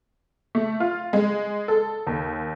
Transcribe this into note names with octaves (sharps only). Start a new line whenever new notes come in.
A3
F4
G#3
A4
D#2